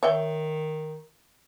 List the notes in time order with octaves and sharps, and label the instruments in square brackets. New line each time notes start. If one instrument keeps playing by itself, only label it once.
[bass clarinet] D#3 [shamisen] C#5 E5 G5